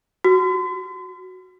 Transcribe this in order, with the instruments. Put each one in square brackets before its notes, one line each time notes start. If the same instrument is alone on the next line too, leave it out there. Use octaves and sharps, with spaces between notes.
[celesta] F#4